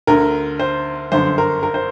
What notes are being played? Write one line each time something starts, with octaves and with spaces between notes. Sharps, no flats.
D2 D3 A#4
C5
G1 F#2 D3 C5
A#4
A#4
C5